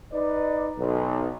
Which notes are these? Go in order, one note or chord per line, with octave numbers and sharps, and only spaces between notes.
D#4 B4 D5
B1